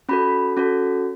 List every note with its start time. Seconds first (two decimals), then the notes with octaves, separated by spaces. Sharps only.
0.09 C#4 F#4 A4 B5
0.57 C#4 F#4 A4